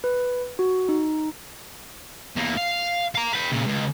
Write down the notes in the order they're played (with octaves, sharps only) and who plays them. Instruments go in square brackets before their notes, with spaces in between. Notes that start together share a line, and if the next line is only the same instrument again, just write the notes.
[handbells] B4
F#4
D#4
[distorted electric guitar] E2 A#3
F5
F5 A#5
B4 G5
A#2 C#3
C#2